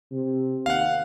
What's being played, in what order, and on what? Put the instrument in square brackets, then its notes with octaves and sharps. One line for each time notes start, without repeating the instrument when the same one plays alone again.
[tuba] C3
[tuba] D#2 [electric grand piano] F5 F#5